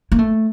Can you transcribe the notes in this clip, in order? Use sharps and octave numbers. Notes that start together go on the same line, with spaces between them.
A#3
A3